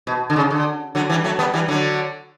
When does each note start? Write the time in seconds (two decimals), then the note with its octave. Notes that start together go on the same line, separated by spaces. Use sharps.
0.07 B2
0.30 D3
0.36 C#3
0.51 D3
0.95 D3 F#3
1.09 E3 G3
1.24 F#3 A3
1.39 G3 B3
1.54 E3 G3
1.68 D3 F#3